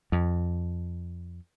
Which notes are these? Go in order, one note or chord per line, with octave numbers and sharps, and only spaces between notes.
F2